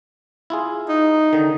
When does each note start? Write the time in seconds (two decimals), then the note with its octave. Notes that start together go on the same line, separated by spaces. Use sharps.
0.50 E4 F4 G#4
0.89 D#4
1.33 D3 D#3